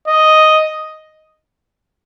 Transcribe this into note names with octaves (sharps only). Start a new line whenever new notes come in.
D#5